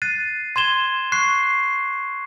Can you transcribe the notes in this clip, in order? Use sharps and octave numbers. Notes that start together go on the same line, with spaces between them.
F#6 A6 C7 D#7
C6 G#6 E7 G7
C#6 F#6 C7